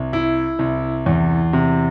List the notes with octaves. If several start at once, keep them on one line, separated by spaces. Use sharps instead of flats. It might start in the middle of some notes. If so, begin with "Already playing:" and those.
Already playing: C2
E4
C2
E2
C3